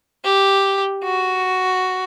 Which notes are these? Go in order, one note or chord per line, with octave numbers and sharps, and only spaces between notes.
G4
F#4